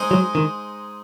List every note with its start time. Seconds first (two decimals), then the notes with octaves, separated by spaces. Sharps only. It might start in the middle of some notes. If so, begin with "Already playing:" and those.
Already playing: G#3 D#4 G#4 C5
0.11 F#3
0.35 D#3